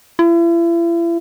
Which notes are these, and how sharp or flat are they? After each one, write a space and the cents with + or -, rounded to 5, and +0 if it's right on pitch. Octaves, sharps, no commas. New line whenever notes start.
E4 +40